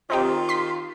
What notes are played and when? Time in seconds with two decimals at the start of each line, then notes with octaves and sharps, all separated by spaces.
0.10 D#3 C4 D#4 F4 G4
0.49 C6 B6